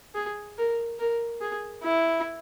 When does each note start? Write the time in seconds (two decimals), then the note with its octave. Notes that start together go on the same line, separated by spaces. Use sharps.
0.15 G#4
0.58 A#4
0.99 A#4
1.41 G#4
1.84 E4